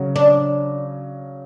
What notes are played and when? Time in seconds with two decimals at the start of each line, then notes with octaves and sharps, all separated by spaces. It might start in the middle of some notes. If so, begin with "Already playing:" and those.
Already playing: C#3 F#3 C#4
0.16 D4